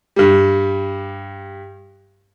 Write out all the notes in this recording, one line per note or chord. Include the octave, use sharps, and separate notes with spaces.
G2 G3